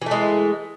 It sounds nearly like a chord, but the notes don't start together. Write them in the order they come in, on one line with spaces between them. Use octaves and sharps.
E3 A3 G#3